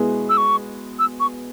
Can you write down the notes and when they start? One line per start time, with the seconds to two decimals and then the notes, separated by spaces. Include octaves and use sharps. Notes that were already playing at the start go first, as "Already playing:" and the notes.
Already playing: B2 G#3 E4 G#4 B4
0.29 E6
0.37 C#6
0.99 E6
1.20 C#6